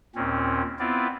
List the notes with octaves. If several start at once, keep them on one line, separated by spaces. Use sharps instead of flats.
D#2 A#2 C4 C#4
B3 C4 E4 F4 D5